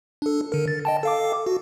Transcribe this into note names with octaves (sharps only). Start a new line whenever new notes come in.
D4 A4
D3 A#4
A6
D#5 G5 A5
A4 F5 D6
F#4